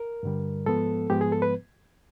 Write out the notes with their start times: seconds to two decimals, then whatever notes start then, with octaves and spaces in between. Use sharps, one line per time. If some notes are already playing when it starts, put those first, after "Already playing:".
Already playing: A#4
0.23 G2 D3 G3
0.66 G#2 F3 G#3 B3 A4
1.10 G#2 F3 G#3 B3 G4
1.21 G#4
1.32 A4
1.42 B4